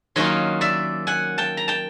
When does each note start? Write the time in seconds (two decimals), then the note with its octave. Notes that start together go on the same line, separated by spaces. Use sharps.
0.16 D#3 F#3 A#3 C#4 F4 C#5 D#5
0.61 D5 E5
1.07 F#5 G#5
1.38 G5 A5
1.57 A#5
1.68 G5 A5